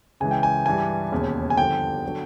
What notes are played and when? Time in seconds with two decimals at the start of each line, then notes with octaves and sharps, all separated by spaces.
0.20 C#2 C#3 E3 G#3 G#5
0.31 G5
0.43 G#5
0.66 G2 E3 G3 G#5
1.12 E1 D#2 C#3
1.50 G#5
1.57 G2 D3 F3 G5
2.06 D3 F#3